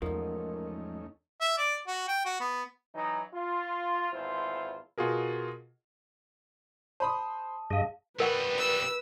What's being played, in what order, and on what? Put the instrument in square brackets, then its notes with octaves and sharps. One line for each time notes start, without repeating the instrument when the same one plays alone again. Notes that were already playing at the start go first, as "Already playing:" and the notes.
[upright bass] E2 [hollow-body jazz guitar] G#2 F3 [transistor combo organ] A3 C#4 D#4 [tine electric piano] A#4
[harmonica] E5
D5
F#4
G5
F#4
B3
[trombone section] E3 F#3 D#4
F4
G#1 E2 E4 F4 C5
[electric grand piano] B2 F4 F#4 G#4 A#4
[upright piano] C5 B5 D#6 [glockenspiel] A5
[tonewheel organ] G2 D#5 [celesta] G#4 F5
[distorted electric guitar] G3 B3 [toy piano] A#4 F#5 C#6 [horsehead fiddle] B4
[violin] E6